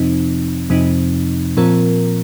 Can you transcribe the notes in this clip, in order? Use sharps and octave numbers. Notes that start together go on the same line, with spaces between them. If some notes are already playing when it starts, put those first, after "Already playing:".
Already playing: F2 C3 F3 C4 D#4
F2 C3 F3 C4 D#4
A#2 F3 C4 F4 A#4